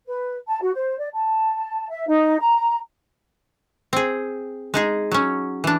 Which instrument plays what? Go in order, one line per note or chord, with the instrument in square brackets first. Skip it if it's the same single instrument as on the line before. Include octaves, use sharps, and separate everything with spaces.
[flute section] B4
A5
F#4
C5
D5
A5
E5
D#4
A#5
[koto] C4 G#4
G#3 D#4 G#4
F#3 C#4
E3 D4